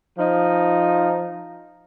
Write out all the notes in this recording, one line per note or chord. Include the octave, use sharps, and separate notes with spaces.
F3 D#4